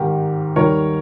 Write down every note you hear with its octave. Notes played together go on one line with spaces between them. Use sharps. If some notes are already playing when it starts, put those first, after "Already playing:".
Already playing: G#1 G#2 D#3 G4 A#4
D#2 D#3 G3 A#4 C#5